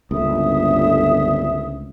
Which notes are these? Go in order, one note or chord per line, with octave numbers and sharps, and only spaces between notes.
D1 G1 C#2 E5 D#6